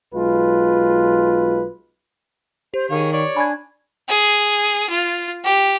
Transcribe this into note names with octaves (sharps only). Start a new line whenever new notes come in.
B1 G#3 F4 B4
G4 C5
D#3 G#4 C#5 F5
C#5 D5
D4 G#5 B5 C#6 G#6
G#4
F4
G4